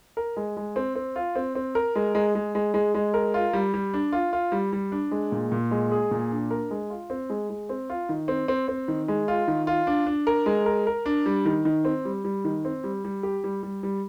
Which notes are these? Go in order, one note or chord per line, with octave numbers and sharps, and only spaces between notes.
A#4
G#3
G#3
C4
C4
F4
C4
C4
A#4
G#3
G#3
G#3
G#3
G#3
G#3
A#4
F4
G3
G3
D4
F4
F4
G3
G3
D4
G#3
A#2
A#2
G#3
G#4
A#2
D4
A#4
G#3
F4
C4
G#3
G#3
C4
F4
D#3
C4
C4
C4
D#3
G#3
F4
D#3
F4
D4
D4
A#4
G#3
A#4
A#4
D4
G3
D#3
D#3
C4
G3
G3
D#3
C4
G3
G3
G4
G3
G3
G3